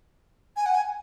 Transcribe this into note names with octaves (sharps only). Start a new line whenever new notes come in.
G#5
F#5
G#5